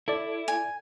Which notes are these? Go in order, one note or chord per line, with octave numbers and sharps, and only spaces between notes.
E4 A4 D5
G#5